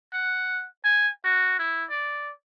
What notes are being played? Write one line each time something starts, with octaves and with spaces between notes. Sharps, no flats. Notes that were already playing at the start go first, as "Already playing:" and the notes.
F#5
G#5
F#4
E4
D5